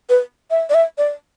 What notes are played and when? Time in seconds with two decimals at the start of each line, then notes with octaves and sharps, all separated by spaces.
0.09 B4
0.51 E5
0.70 D5
0.74 E5
0.98 D5